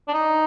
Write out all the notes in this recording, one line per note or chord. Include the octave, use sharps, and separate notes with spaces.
D4
D#4